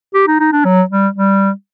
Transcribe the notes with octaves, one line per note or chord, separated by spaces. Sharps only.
G4
D#4
D#4
D4
F#3
G3
G3